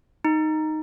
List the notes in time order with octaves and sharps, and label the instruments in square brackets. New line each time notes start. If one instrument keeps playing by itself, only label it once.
[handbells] D#4